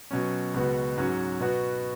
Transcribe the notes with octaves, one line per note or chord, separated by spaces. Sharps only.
B2 F#3 C#4
C#2 B2 B3 F#4
G#2 F#3 C#4 F#4
B2 B3 F#4